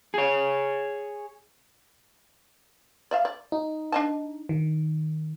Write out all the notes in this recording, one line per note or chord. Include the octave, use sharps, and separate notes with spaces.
G#4 C#5
D5 E5 F5
D5
D#4
D4 D#5 A5
D#3